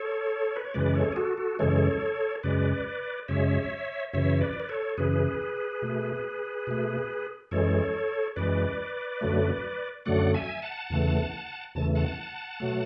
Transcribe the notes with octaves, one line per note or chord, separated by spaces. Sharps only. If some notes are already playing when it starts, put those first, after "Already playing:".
Already playing: A4 C#5
B4
C#5
F#2 C#3 E3 G#3 B4 D5
D5
A4 C#5
G#4
F#4 A4
F#4 A4
F#2 C#3 E3 G#3 A4 C#5
F#2 C#3 G#3 B4 D5
F#2 C#3 G#3 C#5 E5
F#2 C#3 E3 C#5 E5
B4 D5
B4
A4 C#5
F#2 C#3 E3 G#4 B4
B2 A3
B2 A3
F#2 E3 G#3 A4 C#5
F#2 E3 G#3 B4 D5
F#2 D3 F#3 A3
F#2 D3 F#3 A3 D5 F#5
E5 G#5
F#5 A5
E2 C#3 E3 A3
E2 C#3 E3 A3 A5
F#5 A5
B2 F#3 A3